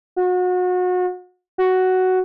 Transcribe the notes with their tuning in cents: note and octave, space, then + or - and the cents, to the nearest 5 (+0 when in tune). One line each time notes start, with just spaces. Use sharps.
F#4 -30
F#4 +5